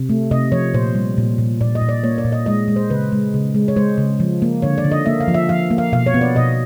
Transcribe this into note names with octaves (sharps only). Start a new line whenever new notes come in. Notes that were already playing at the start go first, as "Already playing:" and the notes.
Already playing: C3
A3
C3 D#5
F3 C#5
A#2 C5
G3
A#2
A#2
A#2 D5
D#5
A#2
D5
A#3 C#5
D5
A#2
D#5
G#3 D#5
G#3
C5
C#3 B4
G#3
C#3
G#3
C#5
G#3 C5
C#3
F3
A#3
D3 C#5
D5
D3
D#5
A#3 E5
F5
F3
E5
F3 F5
A#3
F5
B2 F5
C#5
B3
D5
B2 D#5